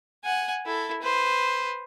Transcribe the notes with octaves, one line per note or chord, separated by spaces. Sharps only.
F#5 G#5
E4 A4
B4 C5